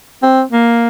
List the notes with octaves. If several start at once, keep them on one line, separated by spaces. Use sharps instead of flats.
C4
A#3